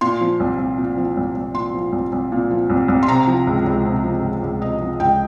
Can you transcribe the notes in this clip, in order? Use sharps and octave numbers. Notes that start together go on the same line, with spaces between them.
A#2 C6
F3
C2
C2
A#2
F3
C2
C2
A#2 C6
F3
C2
C2
A#2
F3
C2
C2
C6
C3 A#5
F3
C#2
C#2
C3
F3
C#2
C#2
C3 D#5
F3
C#2 G5